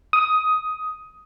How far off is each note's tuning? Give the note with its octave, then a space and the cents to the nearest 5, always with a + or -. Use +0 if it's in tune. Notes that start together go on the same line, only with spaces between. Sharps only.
D#6 +10